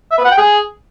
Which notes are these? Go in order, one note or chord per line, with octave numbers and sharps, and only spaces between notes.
E5
B4
F#5
G5
G#4